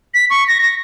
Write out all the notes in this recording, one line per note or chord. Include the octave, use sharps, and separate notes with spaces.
B6
C#6
A#6
A#6